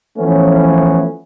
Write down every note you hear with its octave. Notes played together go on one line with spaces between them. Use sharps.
E3 F3 A3 B3 C#4